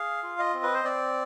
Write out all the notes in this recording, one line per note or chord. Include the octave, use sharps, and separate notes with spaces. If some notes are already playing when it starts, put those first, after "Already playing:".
Already playing: G#4 F5
F4
D#5
C4
B4
C5
C4 D5